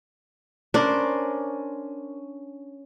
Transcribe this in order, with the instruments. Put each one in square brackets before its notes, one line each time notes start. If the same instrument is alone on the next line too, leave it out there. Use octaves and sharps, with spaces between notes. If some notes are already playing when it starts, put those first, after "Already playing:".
[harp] C#4 [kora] D4 [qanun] A#4 C5 D5